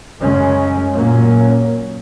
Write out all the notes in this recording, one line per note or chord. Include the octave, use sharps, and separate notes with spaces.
F#2 C#3 G#3 C#4
A#2 F#3 A#3 C#4